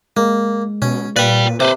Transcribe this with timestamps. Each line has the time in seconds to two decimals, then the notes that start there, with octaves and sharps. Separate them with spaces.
0.17 G#3 A#3
0.82 B2 C#4
1.16 A#2 B4 D5 F5 G5
1.60 C3 B4 C5